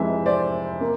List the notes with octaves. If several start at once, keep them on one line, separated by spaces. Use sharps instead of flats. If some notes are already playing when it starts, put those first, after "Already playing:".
Already playing: F1 F2 C3 E3 G#3 E5
C5 D5
A#3